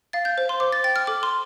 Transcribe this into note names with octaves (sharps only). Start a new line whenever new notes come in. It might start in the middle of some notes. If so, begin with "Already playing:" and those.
F5 A6
G6
C5
C6
C5 D6
A6
G5 A6
F6
A4 D6
C6